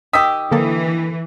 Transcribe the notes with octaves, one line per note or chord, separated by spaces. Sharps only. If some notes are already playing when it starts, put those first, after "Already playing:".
D#3 G4 D#6 E6 B6
D3 E3 A#3 A4